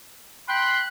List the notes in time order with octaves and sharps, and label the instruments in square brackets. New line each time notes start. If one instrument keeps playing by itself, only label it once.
[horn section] G5 B5 C6 [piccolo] F#6